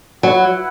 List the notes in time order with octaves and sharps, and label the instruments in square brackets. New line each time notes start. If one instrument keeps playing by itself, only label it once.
[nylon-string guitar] F#3 [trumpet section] E4 B4 F#5